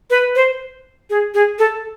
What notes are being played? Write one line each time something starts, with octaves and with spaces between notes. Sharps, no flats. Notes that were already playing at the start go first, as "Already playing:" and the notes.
B4
C5
G#4
G#4
A4